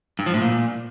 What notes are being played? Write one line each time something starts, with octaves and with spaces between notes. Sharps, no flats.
G2
F3
A2
A#2